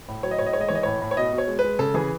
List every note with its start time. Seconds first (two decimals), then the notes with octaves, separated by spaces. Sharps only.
0.08 A2
0.23 F#3 C#5
0.31 D#5
0.39 A2 C#5
0.46 D#5
0.53 G#3 C#5
0.61 D#5
0.68 E3 C#5
0.75 D#5
0.83 A2 C#5
1.01 A2
1.11 C#5
1.17 B2 D#5
1.33 B2
1.38 C#5
1.48 G#3
1.59 B4
1.64 G#3
1.79 C#3 A4
1.94 E3 G#4